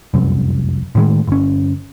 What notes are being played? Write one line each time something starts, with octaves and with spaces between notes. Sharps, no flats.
F1 C2 F#2
A2 D#3 G#3
G1 C#4